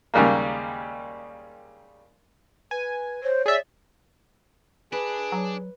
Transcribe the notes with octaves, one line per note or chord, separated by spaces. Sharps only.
D#2 C#3 G3 G#3 A#3
B4 G#5
C5 C#5
G#4 D5 E5
D4 G#4 B4
F#3